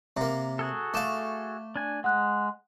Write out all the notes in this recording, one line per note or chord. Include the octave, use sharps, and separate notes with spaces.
C3 A#3 A#5
F#4 G#4 A4
A3 F5 D6 E7
D4 G#5
G#3 F#5 F#6